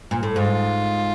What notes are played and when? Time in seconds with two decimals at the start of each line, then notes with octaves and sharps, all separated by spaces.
0.11 A#2
0.23 A2
0.36 G#2 F4